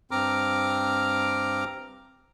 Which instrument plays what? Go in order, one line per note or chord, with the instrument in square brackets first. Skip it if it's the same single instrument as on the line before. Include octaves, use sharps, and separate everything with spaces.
[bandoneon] G2 C4 A#5 D6 F6